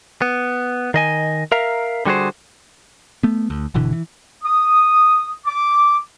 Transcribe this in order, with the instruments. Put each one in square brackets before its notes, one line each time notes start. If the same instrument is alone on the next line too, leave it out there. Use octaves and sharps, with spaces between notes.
[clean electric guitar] B3
D#3 D#5 G#5
A#4 E5 F5 A#5
D3 G3 F#4 G#4 C5
[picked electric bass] A3 B3
D2
G1 B2 D3 E3
E3
[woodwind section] D#6
D6